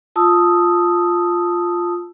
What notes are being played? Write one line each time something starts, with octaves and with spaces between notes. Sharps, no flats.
F4 A5 D#6 E6